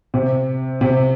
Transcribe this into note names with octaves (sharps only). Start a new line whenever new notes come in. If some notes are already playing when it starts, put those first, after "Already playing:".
C3
C3